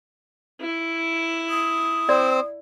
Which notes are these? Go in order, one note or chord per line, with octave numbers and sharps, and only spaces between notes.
E4
D#6
C4 C5 D5